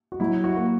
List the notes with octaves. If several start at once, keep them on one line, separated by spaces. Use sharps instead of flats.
F#4
F#3 E4
F#4
A#3